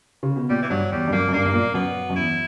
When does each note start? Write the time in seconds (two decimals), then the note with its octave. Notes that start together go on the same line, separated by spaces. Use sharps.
0.23 C#3
0.36 B2
0.50 A#2 G3
0.62 E3
0.70 G2 F#3
0.92 E2 G3
1.08 G2
1.12 F#2 A#3
1.28 F#2
1.33 G2 A#3
1.45 G2
1.53 A#2
1.74 F#2 B3
2.10 F#2
2.16 E2 E4